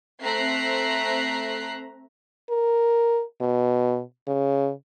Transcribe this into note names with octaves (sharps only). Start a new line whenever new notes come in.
A3 C4 E5 A#5 F#6 C7
A#4
B2
C#3